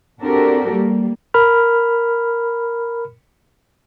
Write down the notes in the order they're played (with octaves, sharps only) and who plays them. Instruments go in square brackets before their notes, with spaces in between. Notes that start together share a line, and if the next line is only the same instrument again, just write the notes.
[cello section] C4 D4 F#4 G4 A4 A#4
G3 A#3
[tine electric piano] A#4 B5 F6